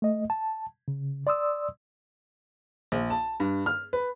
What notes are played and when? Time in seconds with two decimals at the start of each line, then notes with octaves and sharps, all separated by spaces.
0.02 A3 D#5
0.30 A5
0.88 C#3
1.27 D5 C6 D#6 E6
2.92 A#1
3.10 A5
3.40 G2
3.66 F6
3.93 B4